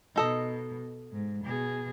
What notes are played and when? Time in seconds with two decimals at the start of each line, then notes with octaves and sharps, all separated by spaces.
0.16 B2 D#4 A4 D#5
1.13 G#2
1.45 B2 G#4